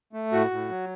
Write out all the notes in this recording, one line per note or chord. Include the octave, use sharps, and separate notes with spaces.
A3
A2 F#4
A2
F#3